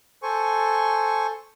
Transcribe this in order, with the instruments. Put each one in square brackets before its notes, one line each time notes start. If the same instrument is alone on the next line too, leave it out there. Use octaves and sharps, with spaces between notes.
[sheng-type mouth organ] A4 C5 G#5 C#6